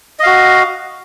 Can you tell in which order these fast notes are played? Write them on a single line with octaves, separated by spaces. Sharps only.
D#5 F5 F#4